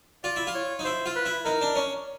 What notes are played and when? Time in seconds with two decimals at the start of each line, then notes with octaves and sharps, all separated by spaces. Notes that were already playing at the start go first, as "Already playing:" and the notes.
0.24 F4 D5
0.36 E4
0.47 F4
0.55 C#5
0.79 D#4
0.85 E4 C5
1.06 F4
1.16 B4
1.25 E4
1.45 D#4 A#4
1.61 D4
1.75 C#4